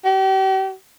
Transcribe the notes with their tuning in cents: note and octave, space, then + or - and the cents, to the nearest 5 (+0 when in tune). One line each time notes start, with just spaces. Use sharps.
G4 -40